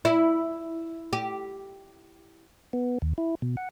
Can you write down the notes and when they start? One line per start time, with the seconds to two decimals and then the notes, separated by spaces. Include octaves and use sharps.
0.05 E4
1.13 G4
2.73 B3
3.02 D#2
3.18 E4
3.42 B2
3.57 F#5